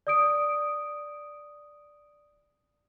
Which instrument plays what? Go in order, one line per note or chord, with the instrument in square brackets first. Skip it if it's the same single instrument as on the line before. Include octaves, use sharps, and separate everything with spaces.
[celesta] D5 D#6 D7